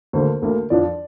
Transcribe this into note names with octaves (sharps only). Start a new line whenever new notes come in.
D2 D3 A#3 C5
D2 D3 A#3
F2 F3 D4 D5